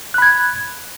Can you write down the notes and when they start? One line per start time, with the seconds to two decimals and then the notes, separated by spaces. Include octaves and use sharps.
0.14 F#6
0.18 B5
0.22 G#6